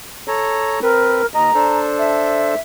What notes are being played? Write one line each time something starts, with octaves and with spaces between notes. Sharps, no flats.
A4 C#5 A#5
C4 A#4 B4
D#2 D#5 A#5
D4 A4 C5
E5